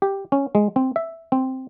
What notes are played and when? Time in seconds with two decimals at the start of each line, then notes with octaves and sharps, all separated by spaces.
0.02 G4
0.32 C#4
0.55 G#3
0.76 C4
0.96 E5
1.32 C4